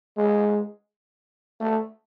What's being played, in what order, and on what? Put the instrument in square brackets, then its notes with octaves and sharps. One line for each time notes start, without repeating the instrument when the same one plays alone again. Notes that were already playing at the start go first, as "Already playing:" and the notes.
[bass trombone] G#3
A3